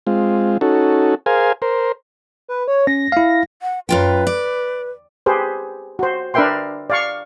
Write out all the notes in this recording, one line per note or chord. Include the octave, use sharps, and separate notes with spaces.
G#3 C4 F4
C#4 D#4 F#4 A4
G#4 A#4 C5 F5 G#5
A#4 C5
B4
C#5
C#4 A#6
E4 F5
F#5
F#2 F4 B4 G5
D5
G4 G#4 B4 C5
F#4 C5
D4 A#4 B4 E5 G5 C6
D5 F5 C#6